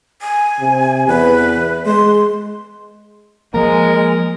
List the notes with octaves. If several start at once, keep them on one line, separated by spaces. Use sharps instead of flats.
G#5
C3
E2 B4
G#3 C6
F3 G#3 A#3 A#4